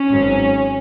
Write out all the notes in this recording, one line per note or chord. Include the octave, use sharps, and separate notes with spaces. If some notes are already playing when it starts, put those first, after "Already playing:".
Already playing: C#4
G#1 G#2 F#3